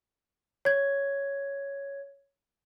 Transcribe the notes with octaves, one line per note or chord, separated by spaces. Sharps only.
C#5 G#6